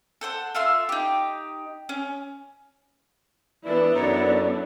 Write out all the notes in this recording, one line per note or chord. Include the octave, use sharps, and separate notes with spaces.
A4 C5 F#5
F4 A4 E5 C6
D#4 G4
C#4
E3 B3 D4 E4 D5
F#2 D#4 A4 C#5